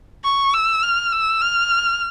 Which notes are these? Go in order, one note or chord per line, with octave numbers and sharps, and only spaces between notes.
C#6
E6
F6
E6
F6